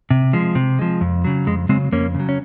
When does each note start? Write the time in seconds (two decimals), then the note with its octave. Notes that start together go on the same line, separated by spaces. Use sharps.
0.11 C3
0.33 F3 G#3
0.55 C3
0.79 F3 G#3
1.01 F2
1.24 C#3 F#3
1.47 F2 G#3
1.69 C#3 F#3 G#3 C4
1.92 F2 A#3 C#4
2.15 C#3
2.20 F#3
2.29 C#4